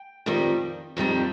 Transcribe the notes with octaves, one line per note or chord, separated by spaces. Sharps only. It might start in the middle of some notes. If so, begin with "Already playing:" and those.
Already playing: G5
F2 D#3 G3 C4
F2 D#3 G3 C4